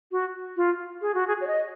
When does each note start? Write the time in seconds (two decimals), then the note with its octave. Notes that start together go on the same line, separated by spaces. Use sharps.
0.12 F#4
0.57 F4
1.02 G#4
1.14 F#4
1.27 G#4
1.41 C#5
1.47 D#5